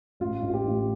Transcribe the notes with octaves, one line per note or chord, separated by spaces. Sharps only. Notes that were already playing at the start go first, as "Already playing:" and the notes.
A1 F4
A1
F4
G4
A1